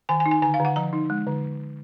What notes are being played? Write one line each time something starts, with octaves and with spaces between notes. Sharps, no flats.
D#3 G#5
G#5
D#4
G#5
D3 G#5
F5
D3
F#5
F3 A#5
D#4
G#3
D3